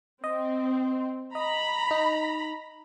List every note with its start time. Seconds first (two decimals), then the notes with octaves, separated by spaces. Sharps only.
0.24 C4 D#5
1.35 D#5 A#5 B5
1.91 D#4